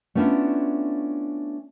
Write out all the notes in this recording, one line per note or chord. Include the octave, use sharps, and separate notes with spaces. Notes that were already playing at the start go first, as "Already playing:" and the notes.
A3 B3 C#4 D4 E4 F4